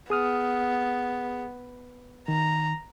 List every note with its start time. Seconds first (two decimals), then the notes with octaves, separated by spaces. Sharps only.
0.10 B3 G#4 D#6 F6
2.28 D#3 A#5